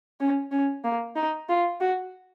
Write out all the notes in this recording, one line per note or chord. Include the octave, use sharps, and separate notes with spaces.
C#4
C#4
A#3
D#4
F4
F#4